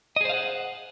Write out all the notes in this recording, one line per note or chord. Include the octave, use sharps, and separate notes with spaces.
G#4 C5 D#5 F5 F#5